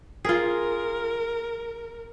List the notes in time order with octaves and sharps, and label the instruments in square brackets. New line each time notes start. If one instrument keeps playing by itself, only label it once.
[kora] F4 G#4 [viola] A#4